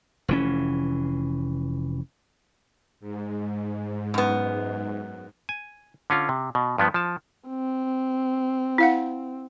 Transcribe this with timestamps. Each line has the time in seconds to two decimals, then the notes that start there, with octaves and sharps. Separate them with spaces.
0.28 F1 E3 C#4
3.00 G#2
4.14 F#2 B3
5.49 G#5
6.10 D3 C#4 F4
6.29 C3
6.55 B2
6.78 G2 F3 B3
6.94 F3 A5
7.49 C4
8.78 E4 F5 F#5